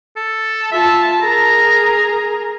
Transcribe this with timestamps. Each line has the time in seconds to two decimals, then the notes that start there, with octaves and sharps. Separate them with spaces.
0.17 A4
0.72 F4 E5 A5
1.22 G#4 A#4 A#5